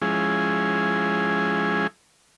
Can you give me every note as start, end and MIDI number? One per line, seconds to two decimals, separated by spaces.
0.02 1.87 53
0.02 1.87 56
0.02 1.87 61
0.02 1.87 64
0.02 1.87 68